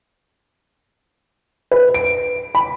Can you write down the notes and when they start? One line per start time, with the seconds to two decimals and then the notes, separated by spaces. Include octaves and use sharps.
1.72 B4
1.94 D7
2.55 B5